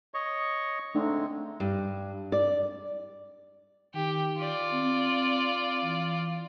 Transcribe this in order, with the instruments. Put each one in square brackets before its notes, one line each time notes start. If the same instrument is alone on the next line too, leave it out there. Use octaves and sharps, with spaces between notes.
[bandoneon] C#5 D#5 C#6
[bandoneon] D3 G#3 C4 [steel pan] A3 D4 D#4
[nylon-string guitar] G2
D5
[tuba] D#3 [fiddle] G4
[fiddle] F4 D5
[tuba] C4
E3